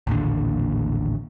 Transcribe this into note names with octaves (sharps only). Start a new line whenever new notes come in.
A1 D#2 A#2 D3